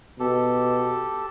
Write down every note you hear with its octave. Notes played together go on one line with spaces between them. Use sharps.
B2 G4 A4